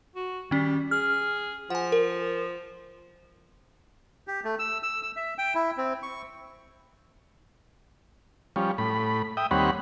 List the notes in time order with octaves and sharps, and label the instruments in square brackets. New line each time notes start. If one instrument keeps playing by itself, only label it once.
[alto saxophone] F#4
[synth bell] D#3 C#4 [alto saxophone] G3
[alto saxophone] G#4 [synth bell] F6
[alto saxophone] F3 [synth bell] F#5 G#5
[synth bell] A#4
[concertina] G4
A3
E6
E6
E6
E5
G5
E4
C4
C#6
[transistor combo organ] F3 G3 C#4
A2 B5
E5 G5 D#6
D#2 G3 C4 C#5 F#5 B5